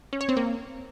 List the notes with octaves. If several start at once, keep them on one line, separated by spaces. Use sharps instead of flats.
C#4
C#5
C4
A#3